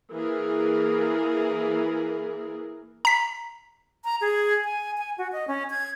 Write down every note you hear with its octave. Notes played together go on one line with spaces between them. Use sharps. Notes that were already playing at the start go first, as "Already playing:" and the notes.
E3 A#3 G#4 A#4
A#5 B6
A#5
G#4
G#5
G#5
F#4
D#5
C#4
G#6